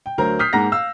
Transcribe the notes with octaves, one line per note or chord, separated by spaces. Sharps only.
G5
D2 F#3 A#4 C5 A#5
D#6 F6 G6 B6 C7
G#2 A#3 G#4 F#5 A#5 A#6
F5 E6